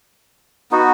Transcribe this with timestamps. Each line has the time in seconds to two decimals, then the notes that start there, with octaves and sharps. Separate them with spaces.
0.71 B3 D#4 F#4